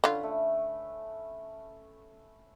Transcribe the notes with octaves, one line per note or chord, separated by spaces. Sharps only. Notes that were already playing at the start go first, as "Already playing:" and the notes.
D3 C#4 F4 B4
A3